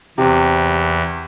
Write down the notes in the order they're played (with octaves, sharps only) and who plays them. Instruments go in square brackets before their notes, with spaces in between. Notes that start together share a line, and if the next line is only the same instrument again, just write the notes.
[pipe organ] E2 [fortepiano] C3